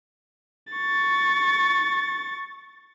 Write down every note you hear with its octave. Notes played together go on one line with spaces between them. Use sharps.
C#6 A6